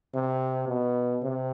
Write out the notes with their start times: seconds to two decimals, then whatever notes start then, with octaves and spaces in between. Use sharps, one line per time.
0.15 C3
0.68 B2
1.23 C3